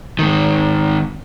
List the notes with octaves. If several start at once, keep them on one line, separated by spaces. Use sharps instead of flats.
G#2 D#3